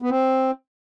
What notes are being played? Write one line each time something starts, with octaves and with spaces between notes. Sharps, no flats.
B3
C4